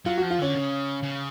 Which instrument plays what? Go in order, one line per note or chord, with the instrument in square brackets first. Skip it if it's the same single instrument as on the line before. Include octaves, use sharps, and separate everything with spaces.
[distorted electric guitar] F#3 [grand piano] F4
[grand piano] F#4
[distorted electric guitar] F3
[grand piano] F4
[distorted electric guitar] D3 [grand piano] C#4
[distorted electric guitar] C#3
C#3